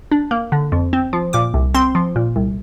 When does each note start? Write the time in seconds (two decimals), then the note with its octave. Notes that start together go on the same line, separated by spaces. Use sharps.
0.11 D4
0.31 A#3
0.52 D3
0.72 F2
0.93 C4
1.13 F3
1.33 A#2 D6
1.54 C2
1.74 C4 C6
1.95 F3
2.16 A#2
2.36 C2